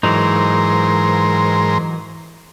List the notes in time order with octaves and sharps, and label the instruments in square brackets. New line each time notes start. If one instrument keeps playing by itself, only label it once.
[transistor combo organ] G#2 A#4 C5 [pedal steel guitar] E3 F#3 D#4